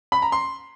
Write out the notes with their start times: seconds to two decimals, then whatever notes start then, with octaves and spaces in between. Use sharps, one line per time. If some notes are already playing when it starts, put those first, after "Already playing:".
0.12 B5
0.22 A#5
0.32 C6